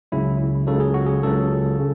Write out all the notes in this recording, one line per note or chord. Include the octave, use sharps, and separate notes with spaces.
C#2 C#3 F#3 E4
C#2 C#3 F#3 A4
G#4
F#4
G#4
C#2 C#3 F#3 A4
C#3